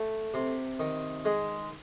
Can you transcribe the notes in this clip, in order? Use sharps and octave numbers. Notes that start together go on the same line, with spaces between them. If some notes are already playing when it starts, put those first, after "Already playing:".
Already playing: A3
C3
D#3
G#3